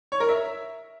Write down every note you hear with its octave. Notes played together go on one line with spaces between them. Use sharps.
C#5
A#4
E5